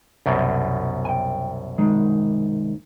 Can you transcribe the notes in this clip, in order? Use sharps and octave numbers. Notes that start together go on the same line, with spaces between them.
C2 F#2 B2
G5 G#5
D#3 G#3 D#4